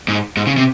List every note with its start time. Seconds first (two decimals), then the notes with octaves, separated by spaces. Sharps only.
0.08 G#2
0.37 G#2
0.47 C#3
0.57 C3